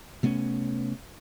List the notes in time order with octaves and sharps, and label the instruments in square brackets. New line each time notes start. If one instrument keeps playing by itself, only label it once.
[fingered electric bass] C3 A3 B3 C#4